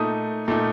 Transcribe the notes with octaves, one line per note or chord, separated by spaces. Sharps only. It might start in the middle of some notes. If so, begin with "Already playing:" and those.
Already playing: A#2 A3 D#4 D#6
A#2 A3 D#4